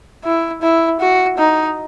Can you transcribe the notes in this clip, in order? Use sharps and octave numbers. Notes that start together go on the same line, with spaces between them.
E4
E4
F#4
D#4